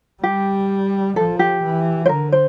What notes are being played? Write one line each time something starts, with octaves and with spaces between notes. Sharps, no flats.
G3 G4
F3 A4
G4
E3
C5
D3 A#4
C5